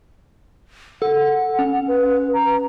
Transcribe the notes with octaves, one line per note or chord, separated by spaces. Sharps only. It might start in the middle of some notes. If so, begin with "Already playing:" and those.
A4 F#5
C#4
B4
A#5